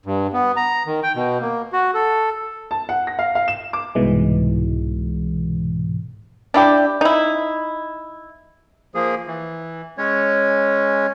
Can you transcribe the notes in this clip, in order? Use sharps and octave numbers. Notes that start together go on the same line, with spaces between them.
G2
B3
A#5
D#3
G5
B2
A#3
F#4
A4
A5
F#5
A#6
F5
F5
E7
D6
C2 G#2 B2 E3 G#3
D4 E4 G4
D#4 E4
F3 A#3 G#4
E3
G#3 C#4 C#5